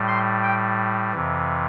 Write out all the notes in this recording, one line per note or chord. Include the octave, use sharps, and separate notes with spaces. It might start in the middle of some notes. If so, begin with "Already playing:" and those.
Already playing: A2 G3
C6
G5
F2 C3 E3